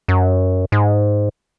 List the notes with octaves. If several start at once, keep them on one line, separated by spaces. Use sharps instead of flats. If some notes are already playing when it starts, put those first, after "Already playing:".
F#2
G#2